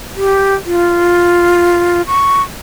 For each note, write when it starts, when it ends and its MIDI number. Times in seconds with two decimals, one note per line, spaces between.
0.16 0.54 67
0.66 2.02 65
2.07 2.42 85